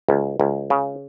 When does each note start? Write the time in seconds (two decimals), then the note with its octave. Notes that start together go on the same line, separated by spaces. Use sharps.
0.09 C#2
0.40 C#2
0.70 C#3